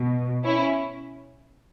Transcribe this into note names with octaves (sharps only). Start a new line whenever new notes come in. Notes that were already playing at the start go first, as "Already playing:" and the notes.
Already playing: B2
C#4 E4